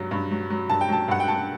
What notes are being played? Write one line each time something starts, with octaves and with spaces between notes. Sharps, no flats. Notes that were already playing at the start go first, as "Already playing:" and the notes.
Already playing: G2 F#3
G2
F#3
F#3
G2 A5
G5
F#3 A5
G2 F#5
G5
G2 A5